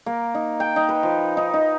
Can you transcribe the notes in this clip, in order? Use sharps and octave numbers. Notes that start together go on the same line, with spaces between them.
A#3
D#4
G5
D#4
B4
F3
D#4
D#4